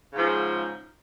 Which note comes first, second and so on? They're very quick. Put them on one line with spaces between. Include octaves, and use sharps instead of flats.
C#3 G#2 F3